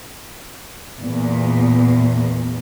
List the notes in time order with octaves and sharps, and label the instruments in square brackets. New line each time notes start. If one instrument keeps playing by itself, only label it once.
[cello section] E2 A#2